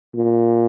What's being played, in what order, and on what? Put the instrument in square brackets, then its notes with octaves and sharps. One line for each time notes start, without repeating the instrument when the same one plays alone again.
[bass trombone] A#2